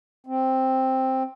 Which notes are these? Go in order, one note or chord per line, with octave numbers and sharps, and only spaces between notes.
C4